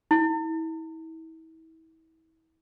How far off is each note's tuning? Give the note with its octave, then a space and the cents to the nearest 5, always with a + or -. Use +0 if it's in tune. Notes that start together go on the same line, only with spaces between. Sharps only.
E4 -35